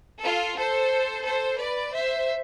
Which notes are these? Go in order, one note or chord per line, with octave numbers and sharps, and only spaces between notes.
F4 A4
A4 C5
A4 C5
B4 D5
C5 E5